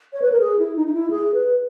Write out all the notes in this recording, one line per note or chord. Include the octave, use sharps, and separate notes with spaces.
C#5
B4
A#4
G#4
E4
D#4
D#4
E4
G#4
B4